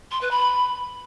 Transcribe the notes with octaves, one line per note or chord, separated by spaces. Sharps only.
C6
B4
B5